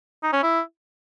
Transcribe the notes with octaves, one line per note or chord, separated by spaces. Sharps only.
D#4
C#4
E4